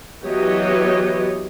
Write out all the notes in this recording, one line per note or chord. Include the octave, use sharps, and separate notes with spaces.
E3 F#3 B3 G4 C#5 D#5